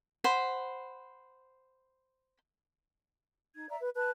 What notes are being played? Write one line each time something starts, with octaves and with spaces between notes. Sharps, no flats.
C5 F#5 B5
D#4 G#6
D5 E5 A#5
B4
B4 A5 F#6